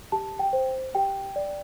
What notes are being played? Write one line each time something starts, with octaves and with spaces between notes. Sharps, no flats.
G4 A5
G5
C5
G4 G5
D5